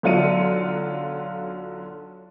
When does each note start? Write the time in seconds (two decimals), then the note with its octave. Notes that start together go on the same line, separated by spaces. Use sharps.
0.03 B1 D3 F#3 F4 C#7 D#7